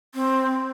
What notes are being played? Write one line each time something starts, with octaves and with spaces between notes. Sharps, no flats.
C4